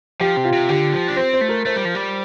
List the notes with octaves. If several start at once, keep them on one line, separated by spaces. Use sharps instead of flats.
F3 G4
C3
F4
C3
D3 G4
F3
D4
C4 C5
C5
A3
A#4
A3 C5
G3
F3
G3